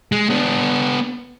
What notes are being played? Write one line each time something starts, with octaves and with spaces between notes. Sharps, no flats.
G#3
B3 D4